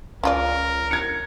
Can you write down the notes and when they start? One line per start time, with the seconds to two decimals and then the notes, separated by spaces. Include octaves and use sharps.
0.23 C#2 C#4 F4 A#4 D5
0.91 G#6 C#7